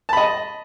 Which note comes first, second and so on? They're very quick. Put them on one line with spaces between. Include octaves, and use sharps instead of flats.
A5 B5 D#5